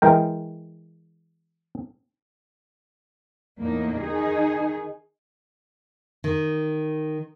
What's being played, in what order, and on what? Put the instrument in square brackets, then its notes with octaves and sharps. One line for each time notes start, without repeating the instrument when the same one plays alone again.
[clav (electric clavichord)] E3 G#3 A#4 G5
[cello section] E2 A2 A#3 D#4
D#3 D#4 G#4
[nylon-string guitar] D#3